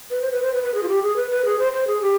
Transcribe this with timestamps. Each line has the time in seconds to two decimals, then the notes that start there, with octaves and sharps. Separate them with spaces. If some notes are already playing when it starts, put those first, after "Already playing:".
0.11 B4
0.22 C5
0.32 B4
0.42 C5
0.54 B4
0.64 B4
0.74 G#4
0.83 F4
0.89 G4
1.03 G#4
1.16 B4
1.31 B4
1.45 G#4
1.59 C5
1.73 C5
1.87 G#4
2.02 G4